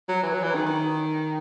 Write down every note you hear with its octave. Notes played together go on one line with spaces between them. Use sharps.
F#3
E3
F#3
E3
D#3
D#3